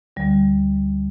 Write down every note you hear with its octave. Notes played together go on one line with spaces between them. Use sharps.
D2 D3 G3